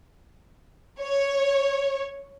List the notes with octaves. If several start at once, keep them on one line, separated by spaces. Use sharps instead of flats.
C#5